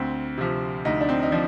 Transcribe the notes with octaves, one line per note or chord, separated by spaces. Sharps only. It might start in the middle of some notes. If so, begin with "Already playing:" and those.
Already playing: D2 C4
C3 F3
D2 D#4
D4
C4
D#4
F3 D4